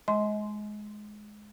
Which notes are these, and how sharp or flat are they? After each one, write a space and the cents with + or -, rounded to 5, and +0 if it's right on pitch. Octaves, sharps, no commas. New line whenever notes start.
G#3 +15 D#5 +35 C6 +0